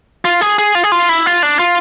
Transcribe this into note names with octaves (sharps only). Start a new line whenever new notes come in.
F4
G#4
G#4
F4
G#4
F4
E4
F4
D4
F4